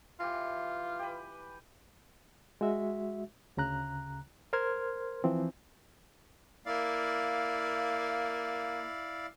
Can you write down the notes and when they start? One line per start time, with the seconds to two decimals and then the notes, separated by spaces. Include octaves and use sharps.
0.20 E3 F4 G4
0.99 G4 B4
2.61 G#3 F#4 E5
3.57 D2 C#3 A#5 F#6
4.53 A#4 C5 C6 F6 G#6
5.24 E3 F3 C4
6.66 A#3 E4 D5 F5